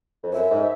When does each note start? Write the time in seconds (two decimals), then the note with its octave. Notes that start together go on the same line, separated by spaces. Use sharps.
0.23 F2
0.33 F#2 E5
0.50 G#2